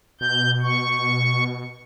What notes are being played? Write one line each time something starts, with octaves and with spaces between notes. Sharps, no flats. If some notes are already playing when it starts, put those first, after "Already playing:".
B2 G6
C#6